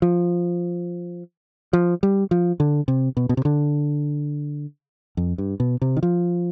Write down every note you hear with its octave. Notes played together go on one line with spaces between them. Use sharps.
F3
F3
G3
F3
D3
C3
B2
B2
C3
D3
F2
G2
B2
C3
D#3
F3